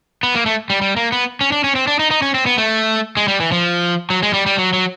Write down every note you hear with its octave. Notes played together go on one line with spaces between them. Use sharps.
B3
A#3
A3
G3
G3
A#3
B3
C#4
D4
C#4
C4
D4
D#4
D#4
C#4
C4
B3
A3
G#3
G3
E3
F3
F#3
G#3
G3
G3
F#3
F#3